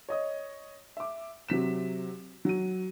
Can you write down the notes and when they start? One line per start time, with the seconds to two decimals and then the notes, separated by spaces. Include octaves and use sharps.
0.09 C#5 D#5 D#6
0.97 E5 D6
1.49 C3 F#3 B6 E7
2.45 F#3 D#7